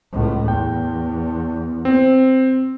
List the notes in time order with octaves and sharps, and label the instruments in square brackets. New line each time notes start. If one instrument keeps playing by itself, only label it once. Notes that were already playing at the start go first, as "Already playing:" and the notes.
[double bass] C#2 A2
[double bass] E2 [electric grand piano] G5
[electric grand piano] C4